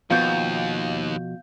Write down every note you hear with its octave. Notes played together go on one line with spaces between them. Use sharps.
D#2 B2 F3 F5 G6